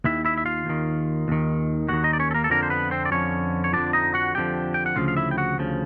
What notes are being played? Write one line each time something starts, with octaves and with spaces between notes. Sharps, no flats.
D#2 D#3 E4 E5
E4 E5
E5
F4 F5
D#2 D#3
D#2 D#3
D#2 D#3 F#4 F#5
D#4 D#5
D5
C#4 C#5
A4
A#3 A#4
A4
F2 D3 F3 A#3 A#4
C5
B3 B4
C4 C5
D5
F2 D3 F3 C#4 C#5
C#5
F2 D3 F3 D4 D5
D#4 D#5
F#4 F#5
F2 D3 F3 G4 G5
G5
F#5
D2 C#3 F3 F4 F5
F5
E4 E5
G5
F#4 F#5
D2 C#3 F3